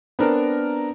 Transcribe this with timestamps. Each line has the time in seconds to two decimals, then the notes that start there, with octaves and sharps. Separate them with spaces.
0.19 B3 C4 D4 A#4